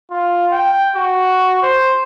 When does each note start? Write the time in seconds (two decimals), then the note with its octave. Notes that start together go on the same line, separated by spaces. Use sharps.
0.11 F4
0.51 G5
0.95 F#4
1.62 C5